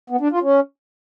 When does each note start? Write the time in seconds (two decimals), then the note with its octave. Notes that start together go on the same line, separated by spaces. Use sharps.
0.10 B3
0.21 D4
0.31 F4
0.42 C#4